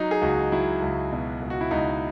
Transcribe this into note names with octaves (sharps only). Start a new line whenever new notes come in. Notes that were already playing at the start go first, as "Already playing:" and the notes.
Already playing: F#3 D#4
G#4
C#2 F#4
F#3 E4
C#2
B2
C#2
F#4
E4
C#2 D#4